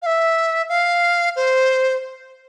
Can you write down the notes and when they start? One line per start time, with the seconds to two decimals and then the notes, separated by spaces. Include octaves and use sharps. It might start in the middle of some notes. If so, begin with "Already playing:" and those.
0.02 F5
0.06 E5
0.69 F5
1.36 C5